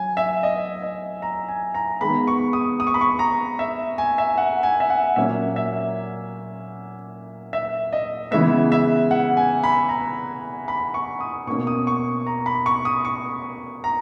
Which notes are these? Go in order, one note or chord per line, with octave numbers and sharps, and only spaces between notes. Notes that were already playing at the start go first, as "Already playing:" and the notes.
Already playing: F#3 G#5
E5
D#5
D#5
A#5
G#5
A#5
D#3 G#3 B3 B5
C#6
D#6
D#6
C#6
B5
C#6
A#5
E5
G#5
E5
F#5
G#5
E5
F#5
A#2 F#3 A#3 C#4 E5
E5
E5
D#5
C#3 E3 G#3 B3 E5
E5
F#5
G#5
B5
A#5
B5
C#6
D#6
B2 A#3 C#4 C#6
D#6
C#6
A#5
B5
C#6
D#6
C#6
A#5